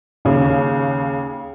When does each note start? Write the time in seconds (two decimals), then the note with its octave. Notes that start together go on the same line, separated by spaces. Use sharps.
0.25 D#2 C#3